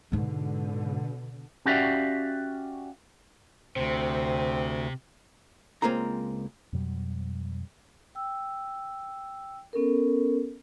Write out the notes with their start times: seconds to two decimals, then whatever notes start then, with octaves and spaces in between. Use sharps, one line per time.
0.12 G#2 B2 D3 G#3
1.65 C#4 F#4 G4 D5 E5 F5
3.76 D2 C3 C4
5.82 C#2 G#3 A#3 C4 F4 A#5
6.73 F2 B2 F#3 G3
8.15 G5 E6
9.73 B3 C#4 A4 A#4